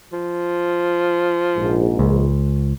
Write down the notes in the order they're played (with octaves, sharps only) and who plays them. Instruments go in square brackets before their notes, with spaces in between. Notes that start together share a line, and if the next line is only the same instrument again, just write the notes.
[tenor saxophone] F3
[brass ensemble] A#1 G#2
[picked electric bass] C#2